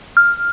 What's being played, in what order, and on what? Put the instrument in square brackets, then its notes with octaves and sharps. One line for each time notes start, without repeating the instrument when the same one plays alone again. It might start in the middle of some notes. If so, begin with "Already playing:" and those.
[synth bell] F6